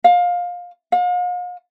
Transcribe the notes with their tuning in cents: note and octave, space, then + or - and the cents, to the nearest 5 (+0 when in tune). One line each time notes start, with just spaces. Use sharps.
F5 +20
F5 +45